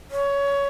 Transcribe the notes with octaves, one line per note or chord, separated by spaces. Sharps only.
C#5